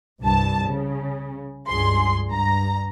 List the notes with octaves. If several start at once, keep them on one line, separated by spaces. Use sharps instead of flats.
C2 G2 A5
C#3
C#2 G2 G#4 C6
G2 A#5